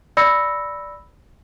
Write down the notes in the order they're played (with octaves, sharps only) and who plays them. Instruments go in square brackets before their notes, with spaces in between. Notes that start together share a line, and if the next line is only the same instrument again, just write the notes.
[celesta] D5 B5 E6 A#6 C#7